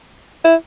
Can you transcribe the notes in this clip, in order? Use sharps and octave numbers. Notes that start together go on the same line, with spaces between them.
E4